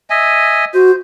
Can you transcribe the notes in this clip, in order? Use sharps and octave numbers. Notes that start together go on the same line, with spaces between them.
D#5 E5 G#5
F#4 C5